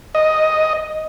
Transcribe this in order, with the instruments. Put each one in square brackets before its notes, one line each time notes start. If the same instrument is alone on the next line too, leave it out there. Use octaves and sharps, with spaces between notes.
[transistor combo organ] D#5